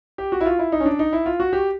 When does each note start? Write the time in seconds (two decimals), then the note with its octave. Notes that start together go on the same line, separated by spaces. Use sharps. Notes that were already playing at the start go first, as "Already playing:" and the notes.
0.18 G4
0.32 F#4
0.41 E4
0.46 F4
0.59 E4
0.72 D#4
0.80 C#4
0.85 D4
0.99 D#4
1.13 E4
1.26 F4
1.40 F#4
1.53 G4